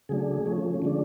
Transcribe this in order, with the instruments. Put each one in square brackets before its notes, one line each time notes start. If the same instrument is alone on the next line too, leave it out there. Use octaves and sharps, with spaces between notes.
[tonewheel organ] C#3 F#3 A3 D4 G#4
F3 A3 C#4
D3 F3 G#3 D4